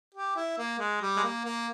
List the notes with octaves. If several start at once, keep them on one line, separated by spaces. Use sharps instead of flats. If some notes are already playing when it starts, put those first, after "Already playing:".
G4
E4
A#3
G#3
G3
G#3
A#3
A#3